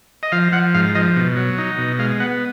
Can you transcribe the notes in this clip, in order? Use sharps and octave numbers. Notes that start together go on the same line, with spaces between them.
D#5
F3 F5
F3 F#5
G#2 F5
F3 D#5
B2
F#3
D#4
B2
G#3 F5
B3 F#5